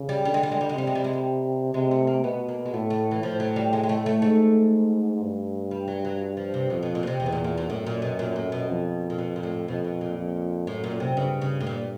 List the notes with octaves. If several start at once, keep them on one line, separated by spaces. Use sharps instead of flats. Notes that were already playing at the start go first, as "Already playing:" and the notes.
Already playing: C#3
G3
D3 G3
G#3
G3
G#3
G3
G#3
C3 G3
G#3
G3
G#3
G3
C3 G#3
A3
A#3
B2 B3
A#3
G#3
A2 A3
A3
E3
A2 F3
F#3
G3
G#3
G#3
A3
A3
G#2 A3
G2
G3
F#3
F#3
F3
C3
F2 B2
B2
A#2
B2
C3
E2 C3
B2
A#2
A#2
A#2
F#2 A2
A#2
B2
A#2
A2
B2
F2
A#2
B2
A#2
A2
F2 B2
B2
A#2
F2
F#2 A2
A#2
C3
G2 C#3
C#3
A2
A#2